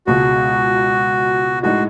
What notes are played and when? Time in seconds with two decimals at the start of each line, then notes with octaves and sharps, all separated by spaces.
0.07 C#2 B2 G#3 F#4
1.63 A2 G#3 D#4 F#4